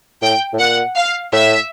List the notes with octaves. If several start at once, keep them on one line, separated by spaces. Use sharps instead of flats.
A2 G5
A2
A#2 F#5
F5
A2 E5